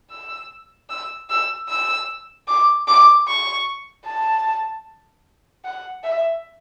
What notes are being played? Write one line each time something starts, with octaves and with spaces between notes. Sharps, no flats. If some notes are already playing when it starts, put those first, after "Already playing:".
E6
E6
E6
E6
D6
D6
C#6
A5
F#5
E5